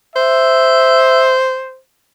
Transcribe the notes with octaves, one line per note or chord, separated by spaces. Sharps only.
C5 E5